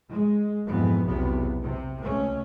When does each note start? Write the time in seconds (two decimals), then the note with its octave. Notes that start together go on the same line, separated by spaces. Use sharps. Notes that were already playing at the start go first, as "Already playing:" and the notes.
0.11 G#3
0.67 F2 G#2 B2 E3 B3
1.05 B1 E2 C3 F#3 B3
1.63 C3
2.00 C#2 A3 C#4